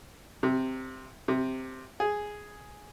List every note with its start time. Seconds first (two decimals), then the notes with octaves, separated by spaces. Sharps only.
0.43 C3
1.28 C3
2.00 G#4